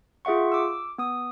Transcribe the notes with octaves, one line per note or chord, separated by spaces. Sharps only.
F4 G#4 E5 F#5 C#6
D6 E6
B3 D#6